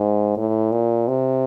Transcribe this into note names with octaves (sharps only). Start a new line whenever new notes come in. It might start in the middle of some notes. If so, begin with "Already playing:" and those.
Already playing: G#2
A2
A#2
C3